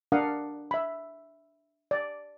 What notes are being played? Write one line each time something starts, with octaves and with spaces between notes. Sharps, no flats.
D4 A#4 F5 F#5 D#6
E5 B5
D5